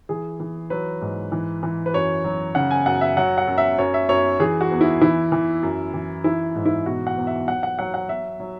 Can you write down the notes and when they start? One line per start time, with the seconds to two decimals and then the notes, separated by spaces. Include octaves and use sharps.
0.09 E3 G#4
0.40 E3
0.70 F#3 B4
1.02 G#2
1.32 E3
1.63 E3
1.86 B4
1.94 F#2 C#5
2.24 F#3
2.55 C#3 F#5
2.71 G#5
2.86 F#2 F#5
3.01 E5
3.17 F#3 F#5
3.38 F#5
3.48 F#2
3.58 E5
3.78 F#2 C#5
3.94 E5
4.09 F#2 C#5
4.40 E3 G#4
4.61 F#4
4.71 E2
4.81 E4
5.01 E3 E4
5.32 E3
5.63 F#2
5.94 E3
6.24 E3 E4
6.55 G#2
6.65 E4
6.86 B2 F#4
7.07 F#5
7.17 E2
7.27 E5
7.48 F#3 F#5
7.63 F#5
7.79 F#3 F#5
7.94 F#5
8.09 F#3 E5
8.40 F#3